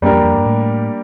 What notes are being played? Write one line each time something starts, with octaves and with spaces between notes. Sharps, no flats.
F#2 G3 A#3 D4 G4 A#4
F2
F2
G2
A2